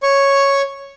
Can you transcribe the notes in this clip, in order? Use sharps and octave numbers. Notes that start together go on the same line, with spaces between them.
C#5 C#6